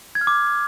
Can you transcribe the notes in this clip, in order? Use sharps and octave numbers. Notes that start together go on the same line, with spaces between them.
G#6
F6
D6